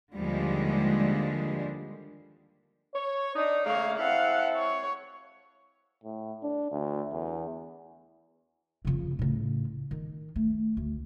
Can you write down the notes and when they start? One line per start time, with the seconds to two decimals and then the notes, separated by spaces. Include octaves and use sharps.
0.15 D#2 D3 F3 G3 G#3 D4
2.93 C#5
3.34 D4 D#4
3.65 C#3 A3 A#3 C#5 F5
3.98 C4 E4 A4 F5 F#5
4.56 C#5
6.04 A2
6.43 D4
6.72 D2
7.12 E2
8.85 F2 C#3
9.19 A2 C#3
9.91 D#3
10.36 A3
10.77 D2